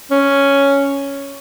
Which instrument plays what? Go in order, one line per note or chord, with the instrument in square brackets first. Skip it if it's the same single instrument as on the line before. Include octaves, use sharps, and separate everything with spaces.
[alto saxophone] C#4